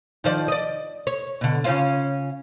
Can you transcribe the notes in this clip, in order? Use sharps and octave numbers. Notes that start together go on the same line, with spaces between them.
D#3 F3 D5
D5 D#5
C#5
B2 D3
C#3 C#4 F4